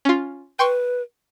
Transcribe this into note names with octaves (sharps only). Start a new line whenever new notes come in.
C#4 F4
B4 G5 C6 C#6